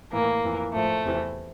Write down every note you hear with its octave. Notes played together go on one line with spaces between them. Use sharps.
A2 E3 A#3
F2 E3
A2 F3 A3
E2 C3 E3